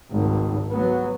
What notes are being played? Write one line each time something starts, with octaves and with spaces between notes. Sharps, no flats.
G#1 C#2
F#3 B3